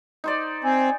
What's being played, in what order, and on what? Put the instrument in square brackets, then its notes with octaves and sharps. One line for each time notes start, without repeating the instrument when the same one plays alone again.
[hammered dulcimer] D#4 C5 D5
[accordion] C4 [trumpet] G#5